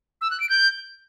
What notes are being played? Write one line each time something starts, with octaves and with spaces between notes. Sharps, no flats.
E6
F#6
D7
G6